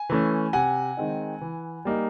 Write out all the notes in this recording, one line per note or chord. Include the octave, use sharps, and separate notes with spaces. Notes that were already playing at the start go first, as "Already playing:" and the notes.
Already playing: G#5
E3 A3 C#4
C3 F#5 G#5
D#3 G#3 C4 D#4
E3
G3 A#3 D#4